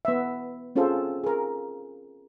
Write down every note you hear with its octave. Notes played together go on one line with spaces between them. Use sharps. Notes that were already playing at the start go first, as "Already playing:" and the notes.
B3 E5
C4 C#4 F4 G#4 A4 C5
G#4 A#4